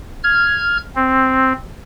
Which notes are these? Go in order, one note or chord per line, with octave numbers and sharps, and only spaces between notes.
F6 G#6
C4